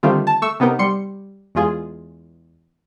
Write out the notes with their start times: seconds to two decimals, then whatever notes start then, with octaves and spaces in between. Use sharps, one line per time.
0.03 D3 D#3 G3 A3 C4 F4
0.27 A5
0.42 A3 C#6 E6
0.60 C3 B3 D#4 A#4
0.79 G3 C6 C#7
1.55 E2 G#3 F4 G#4